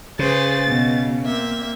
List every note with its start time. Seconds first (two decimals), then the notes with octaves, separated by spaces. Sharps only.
0.19 C#3 G#4 B4 C5 A6
0.68 B2
1.25 A#3 C4 E5